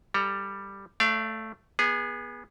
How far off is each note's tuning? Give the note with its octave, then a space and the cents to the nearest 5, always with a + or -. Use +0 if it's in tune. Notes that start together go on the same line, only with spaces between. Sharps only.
G3 +5 A4 +20 A#5 +0
A3 +0 D5 +0 F5 -35
B3 -25 G#4 -10